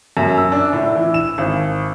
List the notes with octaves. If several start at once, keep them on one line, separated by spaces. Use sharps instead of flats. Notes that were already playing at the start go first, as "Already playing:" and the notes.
F#2
E6
D4
A2
E3
E7
G#1